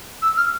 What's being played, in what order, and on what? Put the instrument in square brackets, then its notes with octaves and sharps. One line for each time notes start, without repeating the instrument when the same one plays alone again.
[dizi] E6
F6